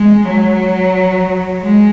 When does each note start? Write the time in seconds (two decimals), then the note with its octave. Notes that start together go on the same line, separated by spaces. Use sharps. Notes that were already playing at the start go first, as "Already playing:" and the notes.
Already playing: G#3
0.30 F#3
1.62 G#3